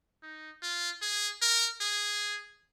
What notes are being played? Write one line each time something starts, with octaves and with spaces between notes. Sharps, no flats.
D#4
F4
G#4
A#4
G#4